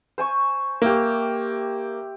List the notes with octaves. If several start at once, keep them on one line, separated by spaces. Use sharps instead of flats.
C5 G#5 C#6
A#3 G4 E5